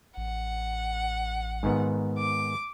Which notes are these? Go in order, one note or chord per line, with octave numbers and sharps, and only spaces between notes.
A1 F#5
G#2 D#3 B3
D6